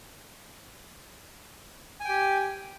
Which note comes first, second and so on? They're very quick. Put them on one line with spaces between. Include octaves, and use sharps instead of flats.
G#5 G5 G4